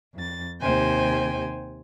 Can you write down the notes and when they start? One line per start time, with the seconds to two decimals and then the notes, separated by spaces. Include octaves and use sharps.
0.16 F2 A6
0.60 D#2 C3 C5 G5 G#5